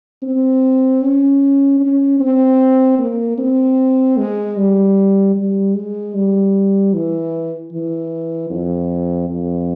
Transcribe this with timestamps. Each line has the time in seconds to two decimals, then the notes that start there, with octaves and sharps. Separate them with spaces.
0.23 C4
1.02 C#4
1.81 C#4
2.20 C4
2.99 A#3
3.38 C4
4.17 G#3
4.57 G3
5.36 G3
5.74 G#3
6.14 G3
6.94 E3
7.72 E3
8.51 F2
9.30 F2